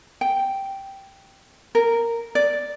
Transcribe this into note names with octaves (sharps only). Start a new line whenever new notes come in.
G5
A#4
D5